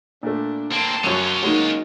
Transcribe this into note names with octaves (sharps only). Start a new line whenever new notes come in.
A#2 A3 D4
A#3 C4 A5 C6
F#2 F#3 C#4 F4
F#3 G#3 A#3 D#4 F#4